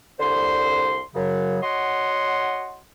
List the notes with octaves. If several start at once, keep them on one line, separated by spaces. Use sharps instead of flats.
C2 D3 C5 C6
F#2 C#3 F#3
F#4 C#5 D#5 F#5 C6